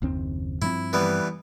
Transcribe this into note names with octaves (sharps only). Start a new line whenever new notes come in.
F#1 D#2 C4
G2 F3 C4 E4
E3 G3 B3